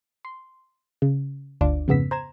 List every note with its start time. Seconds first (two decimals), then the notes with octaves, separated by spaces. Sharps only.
0.25 C6
1.02 C#3
1.61 G1 D2 D4 F4 D6
1.88 F2 G#2 C#3 B3 E6 B6
2.11 C5 A#5 G#6 E7